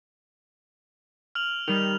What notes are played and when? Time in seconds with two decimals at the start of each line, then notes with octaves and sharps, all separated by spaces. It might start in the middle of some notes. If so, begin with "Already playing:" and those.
1.35 F6 F7 F#7
1.68 D#3 G3 F7